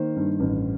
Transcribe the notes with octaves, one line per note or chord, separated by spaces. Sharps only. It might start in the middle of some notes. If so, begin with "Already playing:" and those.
Already playing: D#3 A#3 C5
G2
A1